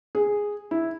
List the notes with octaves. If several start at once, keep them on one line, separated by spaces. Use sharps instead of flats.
G#4
E4